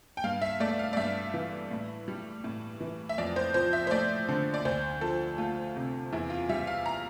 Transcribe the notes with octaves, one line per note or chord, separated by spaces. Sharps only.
G5
G2 F5
E5
A3 D5
F5
D5
G2 E5
E3
A2
G3
A2
E3
E5
F2 D5
C5
F3 C5
E5
C5
A3 D5
D3
D5
D2 C5
F3 A4
A3 F4
C3
E2 E4
F4
G3 E5
F5
A#5